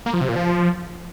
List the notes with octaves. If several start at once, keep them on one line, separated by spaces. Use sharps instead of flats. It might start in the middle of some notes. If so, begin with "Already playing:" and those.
A#3
F3
C3
A#2
F3